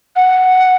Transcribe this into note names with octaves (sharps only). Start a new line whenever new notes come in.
F#5